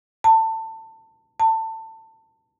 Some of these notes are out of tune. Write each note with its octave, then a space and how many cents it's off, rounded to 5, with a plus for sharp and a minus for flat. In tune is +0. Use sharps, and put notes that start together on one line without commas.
A5 +25
A5 +25